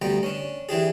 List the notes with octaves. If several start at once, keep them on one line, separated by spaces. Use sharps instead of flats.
D2 G3 B3 G5 A#5
C#4 D4
E3 D4 G4 G#4